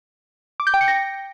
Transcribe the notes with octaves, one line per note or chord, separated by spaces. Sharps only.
D6
G6
G5
C#7
A#6